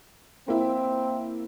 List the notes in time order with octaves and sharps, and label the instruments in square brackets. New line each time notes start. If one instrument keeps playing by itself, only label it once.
[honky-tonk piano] A#3 E4 [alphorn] C4